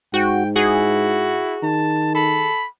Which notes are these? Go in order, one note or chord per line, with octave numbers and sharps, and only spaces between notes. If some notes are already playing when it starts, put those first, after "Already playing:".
G#2 F#4 G5
E4 F#4 G#4
D#3 A5
A4 B5